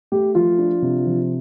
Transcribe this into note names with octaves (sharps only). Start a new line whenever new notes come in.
A3 G4
F3 F4
D4
C3
F3